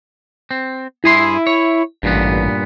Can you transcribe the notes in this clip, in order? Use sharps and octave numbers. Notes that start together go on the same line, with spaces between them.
C4
G2 E4 G#4 C6
C#5
A1 G2 A#2 B3